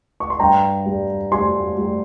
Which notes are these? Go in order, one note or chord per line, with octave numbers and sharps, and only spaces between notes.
C#6
C6
G2 G5 A#5
G3
G3 G#5 C6
G3